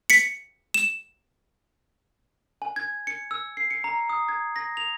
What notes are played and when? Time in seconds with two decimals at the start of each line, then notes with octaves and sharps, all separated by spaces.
0.10 B6 C#7
0.74 E7
2.62 G#5
2.76 G#6
3.07 C#7
3.31 E6
3.57 C7
3.70 C#7
3.84 A#5
4.10 D#6
4.29 G#6
4.56 A#6
4.77 F7